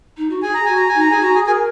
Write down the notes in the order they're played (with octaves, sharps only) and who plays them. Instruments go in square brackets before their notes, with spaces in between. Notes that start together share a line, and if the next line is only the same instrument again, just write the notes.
[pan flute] D#4
F#4
[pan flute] G#4 [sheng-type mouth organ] G#5
[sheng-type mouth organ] A#5
[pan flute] F#4 [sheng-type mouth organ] G#5
[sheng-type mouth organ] A#5
G#5
[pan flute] D#4
[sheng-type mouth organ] A#5
[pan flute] G#4 [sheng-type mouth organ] G#5
[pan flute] F#4 [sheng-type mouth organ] A#5
[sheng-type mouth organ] G#4 G#5
[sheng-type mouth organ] G#4 G#5 [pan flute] A#4